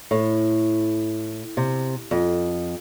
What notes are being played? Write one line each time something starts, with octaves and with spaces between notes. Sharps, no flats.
A2
C3
F2